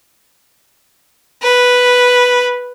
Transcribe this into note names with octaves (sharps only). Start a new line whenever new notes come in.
B4